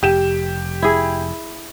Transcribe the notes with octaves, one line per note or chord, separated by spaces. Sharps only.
F1 G4 E7
E4 G#4